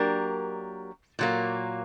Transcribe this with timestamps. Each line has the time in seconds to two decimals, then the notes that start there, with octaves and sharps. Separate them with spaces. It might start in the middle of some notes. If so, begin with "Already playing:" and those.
Already playing: F#3 A#3 D4 G4 A#4
1.19 A#2 F#3 A#3